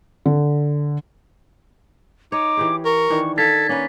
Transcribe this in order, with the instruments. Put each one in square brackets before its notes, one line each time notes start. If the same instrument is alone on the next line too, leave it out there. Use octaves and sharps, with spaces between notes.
[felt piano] D3
[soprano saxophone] D#4 [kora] C#5 [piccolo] D6
[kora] E3 G4 G#4
[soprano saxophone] A#4 [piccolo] C#6
[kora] D#3 E3 D4
[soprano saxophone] A4 [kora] F5 [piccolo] G#6 [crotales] A6 B6
[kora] A#3 B4 [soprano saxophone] C#4